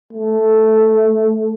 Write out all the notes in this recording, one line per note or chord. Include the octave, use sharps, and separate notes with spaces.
A3